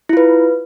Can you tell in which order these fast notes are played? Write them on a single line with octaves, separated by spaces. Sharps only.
E4 F4 B4